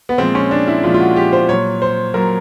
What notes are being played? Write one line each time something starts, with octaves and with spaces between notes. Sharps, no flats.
B3
A#2 F3 G#3 C4
C#4
D4
E4
A#2 F3 G#3 F4
F4
F#4
G4
C5
A#2 F#3 C#5
C5
A#2 F#3 A#4